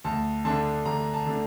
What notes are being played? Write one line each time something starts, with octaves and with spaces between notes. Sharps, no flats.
D2 A5
D3 A3 D4 A5
D2 A#5
A5
D3 A3 D4